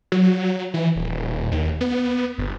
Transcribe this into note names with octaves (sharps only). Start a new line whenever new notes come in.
F#3
E3
D#1
D#2
B3
G1